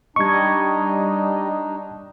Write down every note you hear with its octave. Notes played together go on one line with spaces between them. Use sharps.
G3 D4 D#4 D#5 C#6 G#6